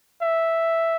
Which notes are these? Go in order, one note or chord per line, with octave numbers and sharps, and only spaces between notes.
E5